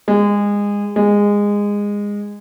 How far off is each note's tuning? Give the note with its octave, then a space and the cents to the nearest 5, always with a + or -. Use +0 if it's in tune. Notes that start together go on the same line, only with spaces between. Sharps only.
G#3 -25
G#3 -20